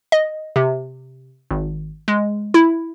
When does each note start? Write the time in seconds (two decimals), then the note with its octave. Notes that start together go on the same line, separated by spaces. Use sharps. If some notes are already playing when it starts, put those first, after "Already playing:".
0.12 D#5
0.56 C3
1.51 G#1
2.08 G#3
2.54 E4